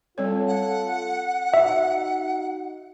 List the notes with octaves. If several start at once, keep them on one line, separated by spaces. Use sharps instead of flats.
G3 C4 F4 A4 C#5
F#5
D#4 F#4 E5